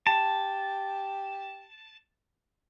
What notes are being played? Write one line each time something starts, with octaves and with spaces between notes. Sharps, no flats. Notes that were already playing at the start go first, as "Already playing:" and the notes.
G4 A5